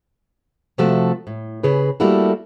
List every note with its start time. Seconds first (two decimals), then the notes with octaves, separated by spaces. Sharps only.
0.78 C3 F3 A3 F#4 A4
1.27 A2
1.63 C#3 G#4 B4
2.00 G3 A3 A#3 E4 F#4 A4